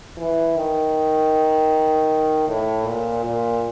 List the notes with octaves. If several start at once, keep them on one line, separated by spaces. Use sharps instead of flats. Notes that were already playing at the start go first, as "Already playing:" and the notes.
E3
D#3
A2
A#2
A#2